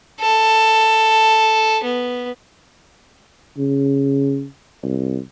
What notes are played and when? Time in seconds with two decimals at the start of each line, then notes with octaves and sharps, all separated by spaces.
0.20 A4
1.84 B3
3.58 C#3
4.83 C2